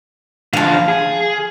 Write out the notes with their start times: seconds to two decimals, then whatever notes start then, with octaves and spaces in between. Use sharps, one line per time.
0.53 D3 F3 F5 A5
0.89 G#4